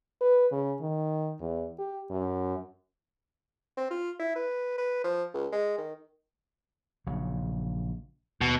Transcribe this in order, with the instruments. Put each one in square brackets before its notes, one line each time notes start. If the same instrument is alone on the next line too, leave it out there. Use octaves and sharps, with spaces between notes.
[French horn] B4
C#3
D#3
E2
G4
F#2
[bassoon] C4
F4
E4
B4
B4
F3
C#2
G#3
D#3
[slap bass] A#1 C#3 F#3
[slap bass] D#2 [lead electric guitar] B2